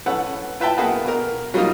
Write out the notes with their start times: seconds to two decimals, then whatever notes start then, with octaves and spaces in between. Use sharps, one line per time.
0.06 C#4 A4 B4 F#5
0.60 F4 B4 E5 G5 A5
0.78 A#3 B3 F#4 G#4 B4
1.04 B2 A#4
1.54 F#3 G3 A#3 D#4 F4